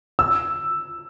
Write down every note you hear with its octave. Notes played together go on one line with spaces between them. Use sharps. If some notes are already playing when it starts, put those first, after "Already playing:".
E6